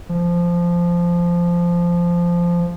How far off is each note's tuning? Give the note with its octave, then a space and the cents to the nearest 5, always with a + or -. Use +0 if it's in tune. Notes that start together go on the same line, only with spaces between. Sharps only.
F3 -10